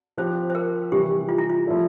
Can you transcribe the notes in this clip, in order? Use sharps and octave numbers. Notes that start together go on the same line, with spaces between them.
F3 C4 G4 C5
C5
A#4
C3 E3 G3 G4
F4
E4
F4
F3 A3 E4 A4